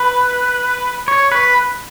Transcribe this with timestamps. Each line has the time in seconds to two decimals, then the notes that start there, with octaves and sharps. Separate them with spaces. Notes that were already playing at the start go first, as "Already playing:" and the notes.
Already playing: B4
1.08 C#5
1.32 B4